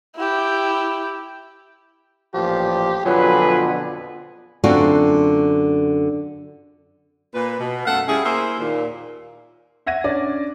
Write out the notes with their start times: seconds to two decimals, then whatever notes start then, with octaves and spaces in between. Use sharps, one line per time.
0.16 E4 G4
2.34 A1 A#2 F3 G4
3.05 F2 B2 D3 F#3 F4 G#4 B4
4.64 F#2 D3 A3 C4 F4 F#4
7.34 A#2 B4
7.60 B2
7.85 F#2 A3 A4 F5 F#5
8.07 G3 C#4 E4 G#4
8.24 A#3 E4 G#4 C5 E5
8.59 D#2 A#2
9.86 E5 F#5 G#6 A#6 D#7
10.04 C#4 D4 D5